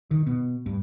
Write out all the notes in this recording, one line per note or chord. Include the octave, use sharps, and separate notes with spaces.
D#3
B2
G2